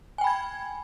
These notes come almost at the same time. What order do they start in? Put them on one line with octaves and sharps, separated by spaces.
G#5 G5 B5 G#6